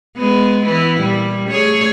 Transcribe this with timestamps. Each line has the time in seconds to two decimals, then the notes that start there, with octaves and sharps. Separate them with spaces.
0.17 G#3 B3
0.63 E3 B3 E4
1.00 A#2 G3
1.49 A3 G#4 C#5